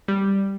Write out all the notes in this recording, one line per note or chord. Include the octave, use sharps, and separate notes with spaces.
G3